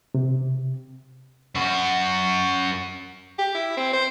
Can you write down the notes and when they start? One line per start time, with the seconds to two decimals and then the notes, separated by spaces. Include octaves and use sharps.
0.14 C3
1.55 F#2 F#4
3.39 G4
3.55 E4
3.77 C4
3.93 C5